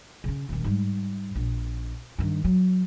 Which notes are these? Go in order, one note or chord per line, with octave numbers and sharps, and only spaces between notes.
C#3 C#4
D#1 D#3
G#2 G3
A#1
G2 D#3
F#3